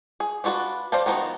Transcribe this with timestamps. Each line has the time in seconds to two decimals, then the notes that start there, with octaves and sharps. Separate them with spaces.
0.20 G#4
0.44 D4 F4 F#4 A4 B4
0.92 C5 D5 F5 G5 A5
1.06 D#3 F3 B3 D#4 F#4